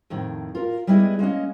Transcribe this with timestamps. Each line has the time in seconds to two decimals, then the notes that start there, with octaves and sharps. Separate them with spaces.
0.10 F2 A2 D#3
0.55 F4 A#4
0.87 G3 G#3 B3 E4 G#4 D#5
1.19 G#3 A#3 C#4 D#5